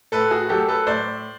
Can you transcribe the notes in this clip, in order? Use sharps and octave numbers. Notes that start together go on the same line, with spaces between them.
A2 A4 B4
F#4 G#4
F#3 A3 G4 A4
A4 B4
A2 C5 D5